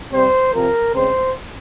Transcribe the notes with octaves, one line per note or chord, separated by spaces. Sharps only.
C3 G3 C4 C5
C3 F3 C4 A#4
C#3 G#3 C4 C5